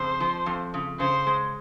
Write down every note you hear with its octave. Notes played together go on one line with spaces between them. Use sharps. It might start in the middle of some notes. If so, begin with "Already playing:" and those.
Already playing: F2 C#3 C5
F3
F2
C#3
C#3 C5
G#3